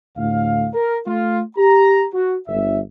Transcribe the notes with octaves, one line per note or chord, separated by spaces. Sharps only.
D2 A2 F5
A#4
A3 F4
G4 A#5
F#4
G1 E5